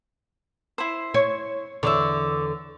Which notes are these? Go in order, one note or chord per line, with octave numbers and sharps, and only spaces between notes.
E4 C5
C#5
E2 D3 C#5 D5 E5